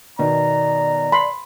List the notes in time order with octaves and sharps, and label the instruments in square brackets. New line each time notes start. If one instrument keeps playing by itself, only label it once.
[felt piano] B2 D#3 [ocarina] D5 [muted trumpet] A#5
[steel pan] B5 C6